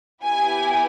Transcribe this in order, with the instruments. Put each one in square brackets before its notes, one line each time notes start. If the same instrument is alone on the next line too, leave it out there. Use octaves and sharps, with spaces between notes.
[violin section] B3 E4 G4 G#5